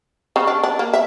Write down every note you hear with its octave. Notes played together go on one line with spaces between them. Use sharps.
C#3
D4
D4
A#3
E5